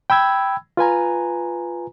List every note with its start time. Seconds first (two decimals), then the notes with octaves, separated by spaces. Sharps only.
0.10 G5 B5 E6 G#6
0.77 F4 B4 G#5 A#5